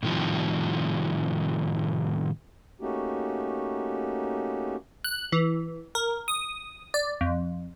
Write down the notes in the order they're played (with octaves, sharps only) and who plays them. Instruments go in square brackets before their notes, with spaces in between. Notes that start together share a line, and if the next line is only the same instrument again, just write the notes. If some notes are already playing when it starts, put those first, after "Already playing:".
[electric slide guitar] A2 C3 D#3 F3 G3
[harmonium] A3 A#3 C#4 D#4 F#4 G4
[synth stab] F#6
E3
A#4
D#6
D5
F2